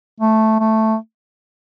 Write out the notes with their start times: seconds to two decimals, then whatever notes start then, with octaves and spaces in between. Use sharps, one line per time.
0.20 A3
0.60 A3